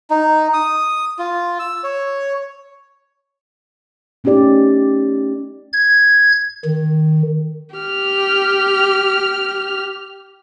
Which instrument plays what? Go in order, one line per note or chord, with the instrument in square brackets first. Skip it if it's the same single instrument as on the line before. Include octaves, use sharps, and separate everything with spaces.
[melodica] D#4
D#6
F4
E6
C#5
[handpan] A3 C#4 D#4 G4 D5
[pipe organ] G#6
D#3
[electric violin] G4 F6